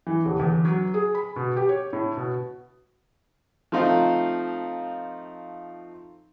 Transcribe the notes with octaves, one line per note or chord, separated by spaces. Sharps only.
E3
D#1
E2
F#3
G#4
B5
B2
G4
C#5
A2
B2
F3 A3 C4 D#4 F4